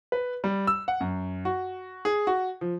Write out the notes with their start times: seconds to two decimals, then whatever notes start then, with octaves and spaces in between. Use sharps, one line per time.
0.12 B4
0.44 G3
0.67 E6
0.88 F#5
1.00 F#2
1.45 F#4
2.05 G#4
2.27 F#4
2.61 F3